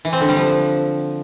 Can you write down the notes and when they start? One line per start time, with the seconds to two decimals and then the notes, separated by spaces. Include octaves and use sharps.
0.05 E3
0.13 C4
0.21 D3
0.29 G3
0.37 F3